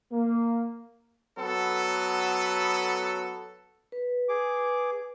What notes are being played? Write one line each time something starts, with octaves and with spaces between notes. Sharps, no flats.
A#3
F#3 B3 A4
B4
G#4 D6